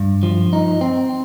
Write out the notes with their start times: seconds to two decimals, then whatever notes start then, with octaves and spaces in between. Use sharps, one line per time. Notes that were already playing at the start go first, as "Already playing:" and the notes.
Already playing: G2
0.23 F3
0.53 D#4
0.81 C4